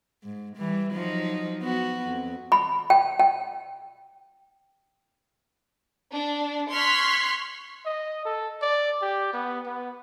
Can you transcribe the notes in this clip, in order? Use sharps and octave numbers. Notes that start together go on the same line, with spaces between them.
G#2
E3 G3
F3 F#3 D#4
B3 F#4
F2
B5
G5
G5
D4
C6 C#6 F6 F#6 G#6 B6
D#5
A4
D5
G4
B3
B3